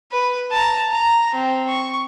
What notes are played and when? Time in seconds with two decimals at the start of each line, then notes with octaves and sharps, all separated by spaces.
0.12 B4
0.51 A5 A#5
0.91 A#5
1.35 C4
1.69 C#6